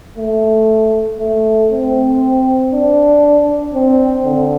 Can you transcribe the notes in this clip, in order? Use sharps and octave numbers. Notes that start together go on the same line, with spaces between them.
A3
A3
C4
D4
C4
D3